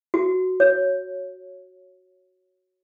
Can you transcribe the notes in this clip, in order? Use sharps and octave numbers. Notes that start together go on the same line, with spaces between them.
F#4
C#5